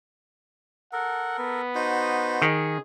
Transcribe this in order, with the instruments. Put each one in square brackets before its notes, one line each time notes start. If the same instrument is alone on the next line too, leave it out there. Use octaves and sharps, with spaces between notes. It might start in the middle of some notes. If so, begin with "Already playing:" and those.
[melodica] A4 A#4 [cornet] F#5
[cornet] B3
[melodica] D#4 F#4 C5
[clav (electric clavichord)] D#3 [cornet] G#4